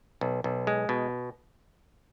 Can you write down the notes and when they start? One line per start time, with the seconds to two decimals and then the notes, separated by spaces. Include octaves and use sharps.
0.21 B1
0.44 B1
0.67 G#3
0.89 B2